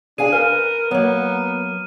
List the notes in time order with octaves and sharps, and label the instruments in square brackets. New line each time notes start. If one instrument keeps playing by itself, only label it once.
[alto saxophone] D4 [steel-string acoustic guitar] G#4 F5 G#5 [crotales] D#7
[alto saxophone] A#4 [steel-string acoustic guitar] B4 [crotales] F6
[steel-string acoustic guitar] F#3 A#3 [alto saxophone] B3